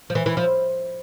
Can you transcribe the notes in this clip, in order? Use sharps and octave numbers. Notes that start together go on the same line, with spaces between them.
F3
E3
E3
F3